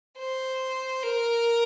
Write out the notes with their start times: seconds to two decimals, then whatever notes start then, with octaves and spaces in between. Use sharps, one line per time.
0.18 C5
1.03 A#4